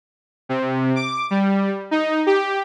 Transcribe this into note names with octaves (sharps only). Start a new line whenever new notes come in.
C3
D6
G3
D#4
G4